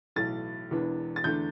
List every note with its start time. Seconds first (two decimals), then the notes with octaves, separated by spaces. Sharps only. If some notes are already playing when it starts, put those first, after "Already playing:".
0.16 B1 A2 E3 A6
0.71 E1 E2 E3 B3 D4
1.16 A6
1.24 E2 D3 A3 D4 G6